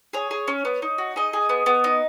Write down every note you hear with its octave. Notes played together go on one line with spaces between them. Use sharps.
G#4 C#5
G#4
C#4
B3
D#4
F#4
D#4 G#4 D#5
G#4
B3
B3
D#4